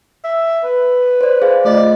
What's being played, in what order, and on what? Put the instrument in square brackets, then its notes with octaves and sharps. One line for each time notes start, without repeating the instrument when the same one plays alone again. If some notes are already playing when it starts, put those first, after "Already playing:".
[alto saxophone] E5
B4
[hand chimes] C5 D5
G#4 C5 F5
[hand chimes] A3 F4 D#5 [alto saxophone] D5